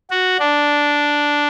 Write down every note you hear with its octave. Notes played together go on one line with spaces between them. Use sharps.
F#4
D4